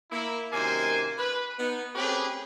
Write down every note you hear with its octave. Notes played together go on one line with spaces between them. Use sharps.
A#3 E4
F#2 C3 D#3 A#3 C5 G#5
B4
B3 D#4
A3 C4 C#4 G4 G#4 B4